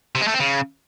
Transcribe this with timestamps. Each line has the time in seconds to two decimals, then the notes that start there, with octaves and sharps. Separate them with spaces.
0.15 C3
0.21 G#3
0.28 A3
0.34 C4
0.40 C#3